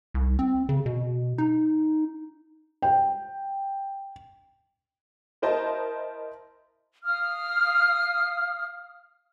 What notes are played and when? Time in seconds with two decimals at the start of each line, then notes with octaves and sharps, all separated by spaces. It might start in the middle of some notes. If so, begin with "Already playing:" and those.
0.14 C2
0.39 C4
0.69 C#3
0.86 B2
1.38 D#4
2.82 G5
5.42 E4 A#4 C5 D#5 A5
7.05 F5 D#6 F6